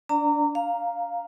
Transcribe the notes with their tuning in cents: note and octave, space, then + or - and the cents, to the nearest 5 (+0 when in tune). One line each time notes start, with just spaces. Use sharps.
D4 -20 D5 +0 A#5 -30
F5 +0 A#5 +0